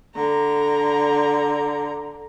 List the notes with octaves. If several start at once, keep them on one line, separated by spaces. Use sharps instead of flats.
D3 A#5